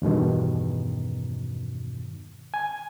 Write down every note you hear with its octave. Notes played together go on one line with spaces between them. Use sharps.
E2 G2 B2 D#3
G#5